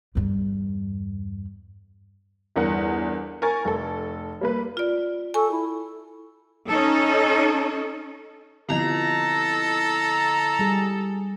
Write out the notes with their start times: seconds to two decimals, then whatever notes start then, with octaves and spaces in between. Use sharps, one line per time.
0.15 E2 G2
2.56 G1 E2 A#4 F#5
3.42 A#4 G#5 C#6 A6
3.65 F1 A4
4.41 G3 A#3 B4
4.77 F4 D5
5.34 A4 G#5 C#6
5.51 E4
6.68 C#4 D#4 A4
8.69 D3 F3 B3 C4 E4 A4 D#5 A#5
10.59 G3 G#4